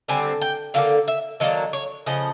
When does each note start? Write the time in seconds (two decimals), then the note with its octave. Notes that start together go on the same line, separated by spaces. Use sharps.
0.08 D3 G3 C4 G#5
0.41 G5
0.74 D3 F#3 A#3 F5
1.08 E5
1.40 D#3 F#3 A#3 D4 D#5
1.73 C#5
2.06 C#3 F3 D#5